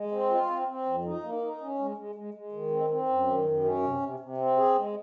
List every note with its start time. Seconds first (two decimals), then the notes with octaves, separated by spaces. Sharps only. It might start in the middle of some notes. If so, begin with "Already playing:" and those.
Already playing: G#3
0.12 C4
0.30 F4
0.50 C4
0.68 C4
0.85 F2
1.05 D#4
1.23 A#3
1.42 D#4
1.61 C#4
1.79 G#3
1.97 G#3
2.15 G#3
2.34 G#3
2.52 D#3
2.71 C4
2.90 C4
3.09 F#2
3.27 D#3
3.45 F#2
3.64 C#4
3.82 C3
4.01 C3
4.20 C3
4.37 C4
4.56 G#4
4.75 G#3